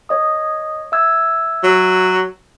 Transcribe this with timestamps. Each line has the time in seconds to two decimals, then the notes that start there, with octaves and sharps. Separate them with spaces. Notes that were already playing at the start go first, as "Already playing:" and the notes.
0.09 C#5 D#5 D#6
0.92 E5 E6 G#6
1.63 F#3